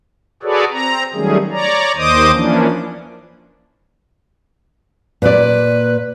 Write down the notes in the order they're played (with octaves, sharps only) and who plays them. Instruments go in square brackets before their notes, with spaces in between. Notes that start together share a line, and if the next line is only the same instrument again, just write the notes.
[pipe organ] F#4 G#4 A4 B4 C#5 D5
C4 A#5
D#3 F#3 G3 A3 C#4 G#4
C#5 D5 A#5
D#2 D#3 C5 D#5 D6 D#6
E3 F3 A#3 C#4 D4
[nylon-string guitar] A#2 D5 [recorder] B4